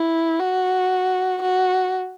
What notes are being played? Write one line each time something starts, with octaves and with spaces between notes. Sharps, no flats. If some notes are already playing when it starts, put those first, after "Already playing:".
Already playing: E4
F#4
F#4